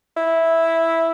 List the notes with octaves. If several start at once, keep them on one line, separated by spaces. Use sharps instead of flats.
E4